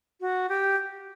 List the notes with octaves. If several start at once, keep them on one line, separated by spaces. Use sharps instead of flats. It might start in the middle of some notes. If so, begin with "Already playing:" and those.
F#4
G4